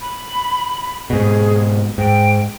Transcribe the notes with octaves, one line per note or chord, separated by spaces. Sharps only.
B5
G#2 B2 G#4
G#2 G5